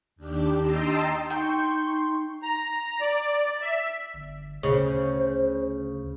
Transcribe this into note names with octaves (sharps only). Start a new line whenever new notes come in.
D#2 D4 G4
D#5 G5 A5 A#5 C6 E6
D#4 G5 C6 C#6 G6
A#5
D5
E5
G1
D2 C#3 C5